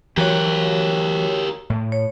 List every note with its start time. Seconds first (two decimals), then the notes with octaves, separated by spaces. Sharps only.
0.17 E3 F#3 F#4 G4 A#4 C#5
1.70 A2
1.92 C#5